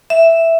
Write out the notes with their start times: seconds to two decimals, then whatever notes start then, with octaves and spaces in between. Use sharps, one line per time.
0.10 E5